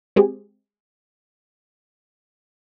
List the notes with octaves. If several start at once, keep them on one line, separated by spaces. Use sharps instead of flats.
G#3 C4 G4 G#4